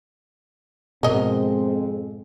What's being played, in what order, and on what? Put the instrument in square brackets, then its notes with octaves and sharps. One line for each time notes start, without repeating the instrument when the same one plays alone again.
[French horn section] F2 G#3 C4 [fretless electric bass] G#2 B2 [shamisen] A#4 D#5